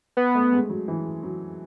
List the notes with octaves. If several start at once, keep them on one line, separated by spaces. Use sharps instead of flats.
B3
A3
G#3
F#3
E3
F#3